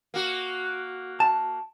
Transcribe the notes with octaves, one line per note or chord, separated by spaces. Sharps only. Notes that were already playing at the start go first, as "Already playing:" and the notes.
A#3 F#4
A5